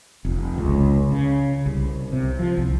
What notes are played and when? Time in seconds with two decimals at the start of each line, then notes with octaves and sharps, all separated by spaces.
0.25 F1
0.58 C#2
1.11 C#3
1.66 C2
2.12 C3
2.39 F3
2.57 C2